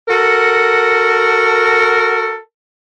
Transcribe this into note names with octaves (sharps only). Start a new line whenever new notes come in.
F#4 A4 A#4